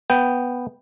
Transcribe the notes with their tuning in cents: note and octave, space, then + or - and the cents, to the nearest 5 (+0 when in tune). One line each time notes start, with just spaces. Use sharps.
B3 +0 G5 +0